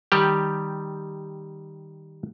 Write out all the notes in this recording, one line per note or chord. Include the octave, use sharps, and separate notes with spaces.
D#3 G3 G4